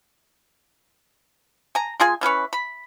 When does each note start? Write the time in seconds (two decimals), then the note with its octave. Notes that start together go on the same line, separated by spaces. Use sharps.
1.75 G#5 A#5
2.00 G#3 F4 G#4 G#5
2.21 E3 C#4 B4 C#5
2.53 B5